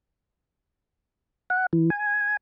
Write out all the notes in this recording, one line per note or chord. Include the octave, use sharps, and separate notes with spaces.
F#5
E3
G#5